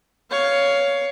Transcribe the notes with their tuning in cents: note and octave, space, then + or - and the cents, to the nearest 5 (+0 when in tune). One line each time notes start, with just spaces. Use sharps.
C#5 +15 F5 +0